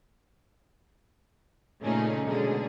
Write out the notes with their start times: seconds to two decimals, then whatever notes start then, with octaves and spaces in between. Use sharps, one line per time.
1.81 A#2 C#3 A3 C#4 D#4 G#4
2.26 B2 D3 G#3 C#4 G#4